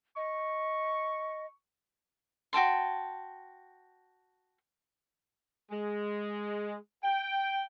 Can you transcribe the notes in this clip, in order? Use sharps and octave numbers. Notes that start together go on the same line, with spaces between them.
D#5 C#6
F#4 G5 A5 C6
G#3
G5